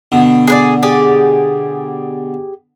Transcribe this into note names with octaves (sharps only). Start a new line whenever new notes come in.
B2 D3
G#4 B4 D5
G4 G#4 D5